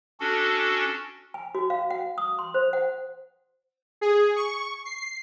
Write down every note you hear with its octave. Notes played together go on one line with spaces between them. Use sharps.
C#4 D4 F#4 A4
G#5
F#4
F5
F#5
D#6
C6
C5
F#5
G#4
C#6
C7